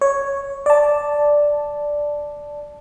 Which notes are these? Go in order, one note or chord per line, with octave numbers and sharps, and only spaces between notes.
C#5
D5 A5